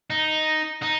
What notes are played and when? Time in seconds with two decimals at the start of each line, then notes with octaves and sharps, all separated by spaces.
0.10 D#4
0.82 D#4